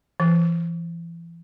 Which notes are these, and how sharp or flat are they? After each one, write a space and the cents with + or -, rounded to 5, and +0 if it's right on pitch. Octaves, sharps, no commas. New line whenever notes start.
E3 +35